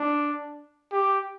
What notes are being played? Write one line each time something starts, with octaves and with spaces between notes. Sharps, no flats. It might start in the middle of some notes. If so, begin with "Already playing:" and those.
Already playing: D4
G4